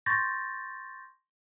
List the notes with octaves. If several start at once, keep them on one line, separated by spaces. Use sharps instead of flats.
C6 C#6 G6 A6 A#6